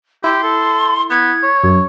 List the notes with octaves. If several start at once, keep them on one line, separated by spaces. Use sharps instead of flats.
E4 G4 C6
A4
B3 G#6
C#5
F#2